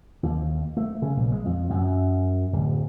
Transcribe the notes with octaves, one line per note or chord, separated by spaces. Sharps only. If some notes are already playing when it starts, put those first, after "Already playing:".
D#2
A3
C#3
A#1
G#3
F2
F#2
D1